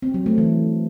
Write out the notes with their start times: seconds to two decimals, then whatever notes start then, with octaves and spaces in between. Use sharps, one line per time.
0.02 C4
0.14 F#3
0.26 A3
0.38 E3